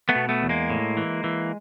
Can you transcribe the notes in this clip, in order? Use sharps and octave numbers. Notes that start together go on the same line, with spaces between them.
A3 B3
B2
A3 B3
E2
G#3 A#3
A2
E3
E3